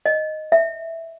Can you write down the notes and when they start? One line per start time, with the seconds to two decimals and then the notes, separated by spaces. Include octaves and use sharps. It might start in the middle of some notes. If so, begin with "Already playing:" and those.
0.06 D#5
0.52 E5